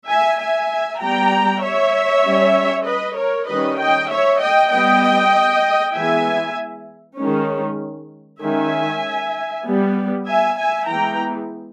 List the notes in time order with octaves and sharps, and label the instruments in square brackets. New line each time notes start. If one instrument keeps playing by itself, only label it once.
[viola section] E5 G#5
E5 G#5
G3 B3 G5 A#5
C#5 E5
G3 C#4
B4 D#5
A#4 C#5
D#3 G3 C#4 B4 D#5
D#5 G5
C#5 E5
D#5 G5
G3 B3 D#5 G5
E3 G#3 B3 E5 G#5
D#3 G#3 C#4
D#3 G#3 C#4 E5 G#5
G3 B3
E5 G#5
E5 G#5
E3 G#3 B3 G5 A#5